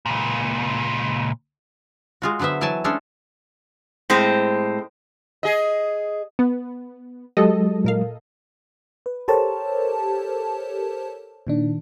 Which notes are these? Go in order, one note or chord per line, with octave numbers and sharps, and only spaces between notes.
C#2 A#2
G#3 F4 F#4
D3 F#3 B3 C5 E5
E3 F#3 E4 G#5 A5
G#3 A3 C#4 D4 A4
A2 G#3 C4
G#4 D#5
B3
F#3 G#3 G4 A4 D#5
A#2 A#4 F5
B4
G4 A4 A#4 C5 C#5 A5
A#2 D#3 D4